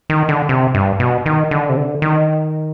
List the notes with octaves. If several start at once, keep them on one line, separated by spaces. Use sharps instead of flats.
D#3
D3
C3
G2
B2
D#3
D3
C3
D3
D#3